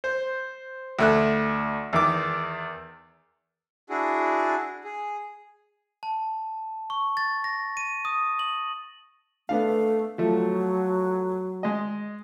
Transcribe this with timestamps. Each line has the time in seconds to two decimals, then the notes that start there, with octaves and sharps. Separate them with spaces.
0.04 C5
0.99 D2 A3 F#6
1.93 E2 D#3 D6
3.90 D4 E4 F#4 G#4
4.84 G#4
6.03 A5
6.90 C#6
7.17 A6
7.44 A#6
7.77 D#7
8.05 D#6
8.39 F#7
9.49 A3 B3 D4 F5
10.18 F3 F#3 A3
11.63 G#3 D#5